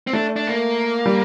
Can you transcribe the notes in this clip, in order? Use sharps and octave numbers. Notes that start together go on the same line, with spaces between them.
C4
A3 D4
D4
A#3
G3